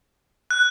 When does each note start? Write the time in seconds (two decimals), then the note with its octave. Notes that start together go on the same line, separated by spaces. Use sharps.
0.51 F#6